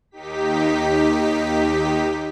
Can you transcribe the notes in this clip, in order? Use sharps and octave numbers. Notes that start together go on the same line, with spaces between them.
D#2 D#4 G4 B6